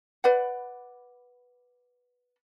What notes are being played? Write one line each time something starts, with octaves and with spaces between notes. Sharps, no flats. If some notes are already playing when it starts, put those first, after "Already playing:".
B4 D5 F#5